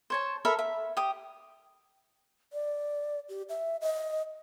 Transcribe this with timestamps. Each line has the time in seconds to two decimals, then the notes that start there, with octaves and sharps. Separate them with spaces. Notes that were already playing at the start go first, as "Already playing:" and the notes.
0.10 C5 C#5 A5
0.45 A4 A#4 E5 B5
0.59 E5
0.97 G4 D#6
2.53 D5
3.29 G4
3.49 E5
3.81 D#5